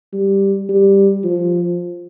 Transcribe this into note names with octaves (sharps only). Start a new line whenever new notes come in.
G3
G3
F3